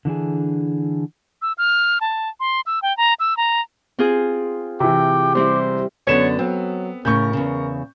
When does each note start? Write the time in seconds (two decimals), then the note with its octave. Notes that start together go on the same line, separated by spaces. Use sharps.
0.05 D3 E3 D4 G#4
1.42 E6
1.58 F6
2.01 A5
2.40 C6
2.66 E6
2.82 G5
2.97 A#5
3.20 E6
3.37 A#5
3.99 C4 F4 G#4
4.80 C3 E3 G5 D6
5.35 G3 C4 E4 C5
6.07 F#2 D3 B3 D4 C#5 E7
6.39 F#3 C4
7.05 A2 C#3 A#4 C#6 G6
7.33 E2 C#3